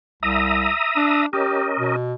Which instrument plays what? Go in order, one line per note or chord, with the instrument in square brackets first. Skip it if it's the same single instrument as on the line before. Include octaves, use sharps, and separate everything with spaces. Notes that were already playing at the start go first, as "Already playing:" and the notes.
[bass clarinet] C2 [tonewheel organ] E5 A#5 D#6
[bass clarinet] D4
[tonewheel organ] C#4 A#4 D#5 [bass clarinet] G4
[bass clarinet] B2